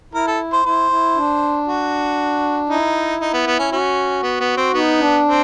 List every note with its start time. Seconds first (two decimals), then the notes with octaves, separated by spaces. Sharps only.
0.14 E4 A#4
0.27 A4
0.52 C5
0.65 E4 C5
0.91 E4
1.16 D4
1.68 F#4
2.69 D#4 E4
3.21 D#4
3.33 B3
3.46 B3
3.59 C#4
3.72 C#4 F#4
4.23 B3
4.40 B3
4.57 C4
4.74 B3 D#4
5.00 D4
5.25 C4